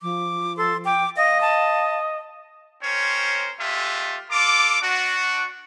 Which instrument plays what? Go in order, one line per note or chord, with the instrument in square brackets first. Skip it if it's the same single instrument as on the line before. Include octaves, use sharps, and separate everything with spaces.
[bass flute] F3 [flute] D6
[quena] A4 [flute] C6
[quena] G5 [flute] D6
[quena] D#5 [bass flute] F5 [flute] A#6
[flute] A5
[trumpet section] C4 C#4 A#4 C5 C#5
G#3 A3 F4 G4 E5
F4 A4 D6
D4 F#4